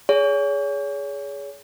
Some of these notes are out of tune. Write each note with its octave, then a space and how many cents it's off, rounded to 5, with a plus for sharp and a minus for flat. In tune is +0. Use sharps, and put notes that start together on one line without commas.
G#4 +0 C#5 +35